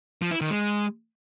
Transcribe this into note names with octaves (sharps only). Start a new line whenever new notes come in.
F3
E4
D#3
G#3